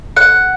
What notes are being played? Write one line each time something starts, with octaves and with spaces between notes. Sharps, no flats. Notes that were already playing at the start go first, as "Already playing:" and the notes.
F#5